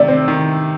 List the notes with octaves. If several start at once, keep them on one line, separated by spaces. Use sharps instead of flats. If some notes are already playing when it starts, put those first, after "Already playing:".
Already playing: C3 D#3 A3 D5
C4
D#3